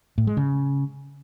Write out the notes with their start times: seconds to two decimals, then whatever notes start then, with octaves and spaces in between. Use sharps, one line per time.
0.18 A2
0.27 G#3
0.37 C#3